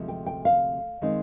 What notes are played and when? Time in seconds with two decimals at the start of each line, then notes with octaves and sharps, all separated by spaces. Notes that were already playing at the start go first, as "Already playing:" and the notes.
Already playing: D2 C3 F3 G#3
0.08 G5
0.26 G5
0.45 F5
1.01 D#3 G#3 C4 D#4